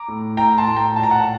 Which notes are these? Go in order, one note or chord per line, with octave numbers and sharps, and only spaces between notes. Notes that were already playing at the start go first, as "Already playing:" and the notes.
Already playing: A#5 D6
A2
A2 G5 A#5
A5 C6
A2
G5 A#5
A#2 A5
A#5
F#5 A5